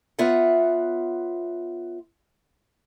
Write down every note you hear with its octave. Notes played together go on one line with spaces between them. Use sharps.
B3 F4 C#5 E5 F#5